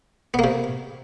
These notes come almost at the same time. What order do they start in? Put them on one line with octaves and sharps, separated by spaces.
B3 A#3 C3